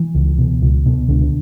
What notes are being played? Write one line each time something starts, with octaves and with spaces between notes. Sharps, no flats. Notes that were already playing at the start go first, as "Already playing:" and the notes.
Already playing: E3
C#2
B2
C#2
B2
C#2 D3